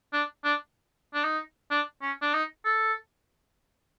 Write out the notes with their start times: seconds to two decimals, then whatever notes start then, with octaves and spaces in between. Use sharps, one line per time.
0.13 D4
0.44 D4
1.14 D4
1.24 D#4
1.71 D4
2.02 C#4
2.22 D4
2.33 D#4
2.65 A4